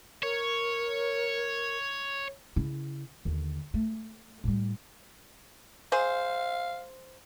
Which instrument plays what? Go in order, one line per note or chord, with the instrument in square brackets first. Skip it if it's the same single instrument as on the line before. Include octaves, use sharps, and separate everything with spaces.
[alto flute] A#4 [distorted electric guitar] C#5
[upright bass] C#3 E4
D#2 D3
A3
A2 G3
[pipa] G#4 C5 [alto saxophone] F5